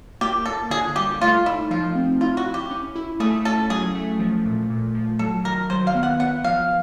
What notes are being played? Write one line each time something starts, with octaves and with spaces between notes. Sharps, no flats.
A#3 G4
A#3 A4
D3 G#4
G3 G4
A3 F4
D#4 E4
F3 F4
C4
E4 F4
F#4
E4
G4
C#4
E4
A3 G#4
C#4 A4
F#3 G#4
A3
F3
A#2
A#2
F3
F#3 A4
D#3 A#4
F#3 C5
F5
B3
F#5
B3 F#5
F3 F5